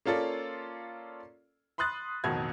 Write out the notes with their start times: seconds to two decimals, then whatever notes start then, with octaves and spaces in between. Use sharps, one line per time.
0.05 A#3 C#4 F4 A4 D5
1.78 B5 C6 D#6 F#6 A6
2.24 A1 F2 B2 D#3 F#4 G#6